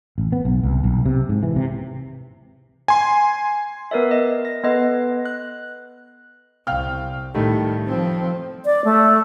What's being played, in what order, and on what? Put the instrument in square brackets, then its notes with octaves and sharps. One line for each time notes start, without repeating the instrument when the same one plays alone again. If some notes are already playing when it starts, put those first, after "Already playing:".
[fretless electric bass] A1
B3
B1
C2
B1
C3
G#2
E3
C3
[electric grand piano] G#5 C6
[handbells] B3 A#4 B4 D5 E5
D#5
A#6
B3 A4 B4 D#5
F#6
[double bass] C2 [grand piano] F5 G5 F6
[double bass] A2 [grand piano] D#3 G3 A3
[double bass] F3 C4
[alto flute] D5
A3